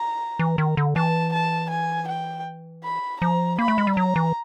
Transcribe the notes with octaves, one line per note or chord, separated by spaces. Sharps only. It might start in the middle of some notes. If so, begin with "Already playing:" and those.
Already playing: A#5
E3
D#3
D3
E3 A5
A5
G#5
G5
B5
F3 A#5
A#3 B5
A3
G#3
G3
F#3 A#5
E3